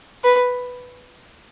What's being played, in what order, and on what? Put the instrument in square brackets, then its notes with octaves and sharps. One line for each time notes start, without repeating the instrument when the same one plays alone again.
[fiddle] B4